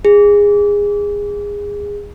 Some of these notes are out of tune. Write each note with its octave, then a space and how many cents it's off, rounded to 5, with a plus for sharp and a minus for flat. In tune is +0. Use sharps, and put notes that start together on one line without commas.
G#4 -20